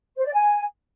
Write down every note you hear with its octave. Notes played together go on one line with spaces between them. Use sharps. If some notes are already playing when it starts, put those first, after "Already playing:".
C5
D5
G#5